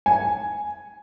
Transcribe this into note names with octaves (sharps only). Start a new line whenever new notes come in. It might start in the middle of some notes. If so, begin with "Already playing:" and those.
G#5